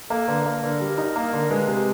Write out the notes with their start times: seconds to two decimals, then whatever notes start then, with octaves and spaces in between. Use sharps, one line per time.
0.10 A#3 A4
0.28 D3 B4
0.45 A#3 A#4
0.63 D3
0.80 G3
0.98 D#4
1.16 A#3
1.33 D3
1.50 G#3 B4
1.67 C3